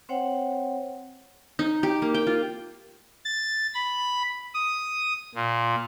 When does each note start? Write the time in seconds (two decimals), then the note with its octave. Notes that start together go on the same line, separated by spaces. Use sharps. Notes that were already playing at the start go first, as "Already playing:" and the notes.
0.09 C4 C5 C#5 F#5 G5
1.59 D#4
1.83 G4
2.02 A#3
2.14 G5
2.27 F4
3.25 A6
3.74 B5
4.54 D#6
5.35 A#2